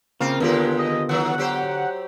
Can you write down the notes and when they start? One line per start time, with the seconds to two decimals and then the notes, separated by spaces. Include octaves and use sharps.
0.21 C#3 A#3 C4 F4
0.40 D#2 D3 G#3 B3 F4 G4 A#4
0.79 D#5
1.09 D#3 F#3 F#5
1.38 F#3 G4 C5